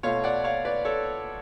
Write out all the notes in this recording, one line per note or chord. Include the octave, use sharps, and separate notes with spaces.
B2 A3 F4 C#5 F5
D5 F#5
C#5 F5
B4 D5
A4 C#5